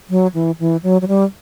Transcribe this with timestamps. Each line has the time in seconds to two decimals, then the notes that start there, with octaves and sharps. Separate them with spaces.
0.10 F#3
0.34 E3
0.60 E3
0.83 F#3
1.02 F#3
1.08 G3